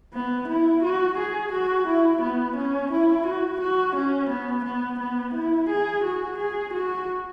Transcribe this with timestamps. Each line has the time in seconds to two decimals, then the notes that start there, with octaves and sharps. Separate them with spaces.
0.13 B3
0.48 E4
0.83 F#4
1.17 G#4
1.52 F#4
1.87 E4
2.22 B3
2.56 C#4
2.91 E4
3.26 F#4
3.61 F#4
3.95 C#4
4.30 B3
4.65 B3
4.99 B3
5.34 E4
5.69 G#4
6.04 F#4
6.38 G#4
6.73 F#4